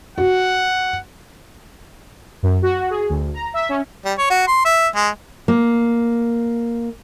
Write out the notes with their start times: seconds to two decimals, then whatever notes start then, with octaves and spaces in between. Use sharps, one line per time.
0.18 F#4 F#5
2.43 F#2
2.62 F#4
2.90 G#4
3.10 D2
3.34 A#5
3.54 E5
3.69 C#4
4.05 G3
4.18 C#5
4.30 F#4
4.48 C6
4.65 E5
4.95 G#3
5.48 A#3